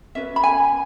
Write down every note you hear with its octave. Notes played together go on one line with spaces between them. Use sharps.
C#4 F#4 B4 E5
B5
G#5